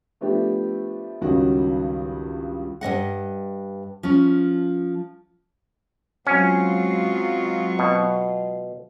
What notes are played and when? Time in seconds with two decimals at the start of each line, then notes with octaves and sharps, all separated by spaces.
0.21 F3 A3 B3 D4 G4
1.21 C#2 G2 D#3 C#4 F#4
2.81 G2 F#3 D#5 F#5
4.03 F3 C#4
6.27 F#3 G#3 C4 C#4 F4 F#4 C#6
7.79 B2